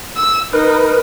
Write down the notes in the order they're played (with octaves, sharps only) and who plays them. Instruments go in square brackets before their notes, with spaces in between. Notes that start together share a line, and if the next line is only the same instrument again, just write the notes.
[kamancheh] E6
[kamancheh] D#4 [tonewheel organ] A#4 B4